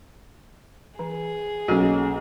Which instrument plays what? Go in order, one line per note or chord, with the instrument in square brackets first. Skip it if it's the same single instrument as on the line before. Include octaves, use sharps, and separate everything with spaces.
[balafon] E3 [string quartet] G#4
[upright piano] B1 [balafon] A#3 A4 [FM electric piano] C#4 F#4